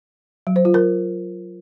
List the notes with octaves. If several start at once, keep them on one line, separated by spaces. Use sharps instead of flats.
F#3
C5
F4
A#4